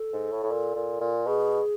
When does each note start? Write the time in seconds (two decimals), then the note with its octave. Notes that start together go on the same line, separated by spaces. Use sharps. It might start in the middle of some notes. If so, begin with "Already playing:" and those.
Already playing: A4
0.13 G#2
0.32 A2
0.43 A2
0.51 A#2
0.75 A#2
1.01 A#2
1.26 B2 G#4